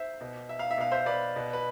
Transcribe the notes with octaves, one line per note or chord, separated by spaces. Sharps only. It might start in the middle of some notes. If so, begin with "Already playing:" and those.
Already playing: C5 E5
B2
E5
F5
E5
B2 F5
C5 E5
B4 D5
B2
B4